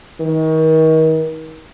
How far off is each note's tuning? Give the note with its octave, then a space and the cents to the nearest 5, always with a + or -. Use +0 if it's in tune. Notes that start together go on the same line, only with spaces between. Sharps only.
D#3 +35